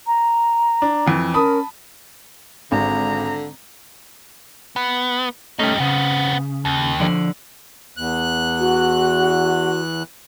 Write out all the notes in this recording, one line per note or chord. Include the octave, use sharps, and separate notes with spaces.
A#5
D4
F2 E3
C#4 A#4 A5 B5 D#6
G#1 D3 A#5
B3
G3 A3 C#4 D#4
C#3 B3 C4
D#2
D3 F3 D5
E2 F#6
F#4